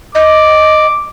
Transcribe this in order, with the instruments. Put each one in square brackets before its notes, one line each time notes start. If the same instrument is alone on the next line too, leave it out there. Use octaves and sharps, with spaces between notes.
[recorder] D#5 [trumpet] D6